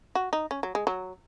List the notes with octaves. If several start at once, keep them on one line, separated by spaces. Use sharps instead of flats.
F#4
D#4
C#4
F#3
G#3
F#3